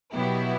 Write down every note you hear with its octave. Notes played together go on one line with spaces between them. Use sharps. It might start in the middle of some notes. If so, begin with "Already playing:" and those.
B2 F#3 B3 E4 G4